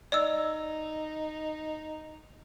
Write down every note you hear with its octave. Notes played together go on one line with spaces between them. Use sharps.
D#4 D5 D#5 E6